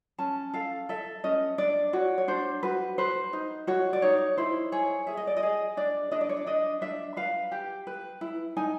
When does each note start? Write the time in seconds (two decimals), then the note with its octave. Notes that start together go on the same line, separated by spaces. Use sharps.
0.18 C#4 A5
0.54 A4 F5
0.89 A4 E5
1.24 C#4 D#5
1.58 D4 D5
1.93 F#4 C#5
2.18 C#5
2.28 D4 C5
2.63 F#4 B4
2.98 B4 C5
3.33 D#4
3.67 F#4 C#5
3.93 D5
4.02 D#4 C#5
4.37 E4 C5
4.72 G#4 C#5
5.07 G#4 E5
5.17 D#5
5.27 D5
5.37 D#5
5.43 G#4
5.77 D4 D5
6.11 D4 D#5
6.21 D5
6.29 C#5
6.37 D5
6.46 D4 D#5
6.81 D4 E5
7.17 B4 F5
7.52 G4 G5
7.87 B4
8.21 E4
8.57 D#4 G#5